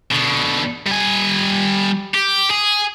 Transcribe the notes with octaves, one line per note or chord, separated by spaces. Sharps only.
B2 D3
G3 G#5
G4
G#4